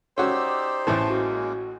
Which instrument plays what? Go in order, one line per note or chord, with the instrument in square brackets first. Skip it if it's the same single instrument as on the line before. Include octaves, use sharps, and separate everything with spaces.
[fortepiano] C#4 F#4 [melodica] D#4 G4 D5 [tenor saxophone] C5 [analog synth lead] E6
[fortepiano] A1 A2 E3 [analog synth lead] A5
[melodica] G#3 A#3 C#4 [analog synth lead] F#4